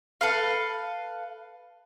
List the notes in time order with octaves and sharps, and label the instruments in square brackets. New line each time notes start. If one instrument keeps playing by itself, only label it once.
[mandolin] A4 B4 F5